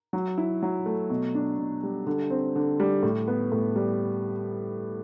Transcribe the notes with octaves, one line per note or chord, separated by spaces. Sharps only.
F#3
E4
F#3
A3
B2
D4
B2
G3
D3
C4
D3
G3
A2
B3
A2
G3